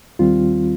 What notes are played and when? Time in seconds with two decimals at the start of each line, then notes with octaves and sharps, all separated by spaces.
0.19 D#2 D#3 G3 C4 F4